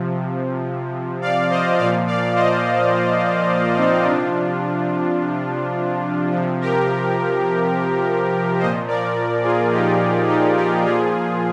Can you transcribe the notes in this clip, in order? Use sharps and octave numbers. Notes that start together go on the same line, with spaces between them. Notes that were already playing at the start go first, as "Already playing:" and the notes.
Already playing: C3 F3
D5 F5
C5 D#5
A#2 F3 D5 F5
D5 F5
C5 D#5
C4 D#4
C3 F3 D4 F4
C3 F3
G4 A#4
A#2 F3 C5 D#5
A#4 D5
F4 G#4
D#4 G4
D#4 G4
G4 A#4
A#2 F3 F4 G#4